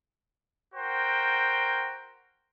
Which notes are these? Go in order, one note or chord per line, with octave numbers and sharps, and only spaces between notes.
F#4 A#4 C5 G5